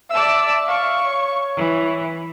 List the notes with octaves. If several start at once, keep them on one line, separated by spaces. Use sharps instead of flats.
D5 E5 A5 E6
F5 C#6
C#5
E3